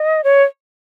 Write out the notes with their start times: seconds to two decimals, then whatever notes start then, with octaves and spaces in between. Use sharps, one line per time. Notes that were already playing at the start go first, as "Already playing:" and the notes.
Already playing: D#5
0.24 C#5